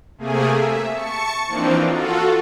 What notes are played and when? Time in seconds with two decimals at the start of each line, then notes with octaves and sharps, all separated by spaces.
0.18 C3 A3 A#3 G#4 G#5
0.56 E5
0.93 A5 C#6 C#7
1.47 E3 F3 A#3 C4 D4 D#4
1.86 F4 F#4 A4